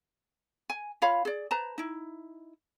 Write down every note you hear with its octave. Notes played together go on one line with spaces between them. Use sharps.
G#5
F4 C#5 F5 B5
G#4 D5
B4 C5 A5 A#5
D#4 E4